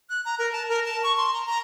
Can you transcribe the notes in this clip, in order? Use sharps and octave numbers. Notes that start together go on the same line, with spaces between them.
F#6
A#5
A#4
A5
A#4
A5
C#6
C6
A#5
A#5